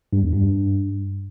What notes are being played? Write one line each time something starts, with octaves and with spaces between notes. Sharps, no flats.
G2
E2
G2